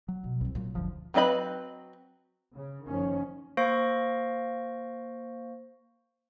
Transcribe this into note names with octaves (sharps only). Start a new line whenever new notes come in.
F#3
B2
C2 F3 C4
A#2 F#3 B3
F#1 D2 F3
F#3 C4 B4 D#5 B5
C#3
F#1 F#2 D#3 F3 C#4
A#3 C5 F5 C#6 A#6 D7